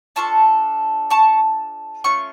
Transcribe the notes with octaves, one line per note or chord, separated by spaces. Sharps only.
D4 F4 A4 A5 C#6
A5 C#6
A3 C#4 F4 C#6